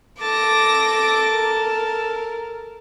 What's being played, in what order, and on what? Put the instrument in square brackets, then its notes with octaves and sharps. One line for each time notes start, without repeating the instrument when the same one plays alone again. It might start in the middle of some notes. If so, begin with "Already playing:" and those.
[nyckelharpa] A4 A5 [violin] D6 A#6
[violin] A#4